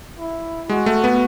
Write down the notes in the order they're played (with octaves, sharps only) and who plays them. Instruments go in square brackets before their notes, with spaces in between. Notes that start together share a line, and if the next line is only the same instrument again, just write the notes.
[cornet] E4
[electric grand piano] G#3 [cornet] F#4
[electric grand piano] A3
B3